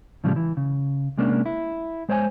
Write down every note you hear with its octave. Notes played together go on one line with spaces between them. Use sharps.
A2 C#3 F3 G3 G#3
E3
C#3
C3 G#3 A#3 C#4 D4
E4
G#3 C5 C#5 G5 G#5